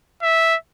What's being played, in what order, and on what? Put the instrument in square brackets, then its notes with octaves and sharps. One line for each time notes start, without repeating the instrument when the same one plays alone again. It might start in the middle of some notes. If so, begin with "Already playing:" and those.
[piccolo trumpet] E5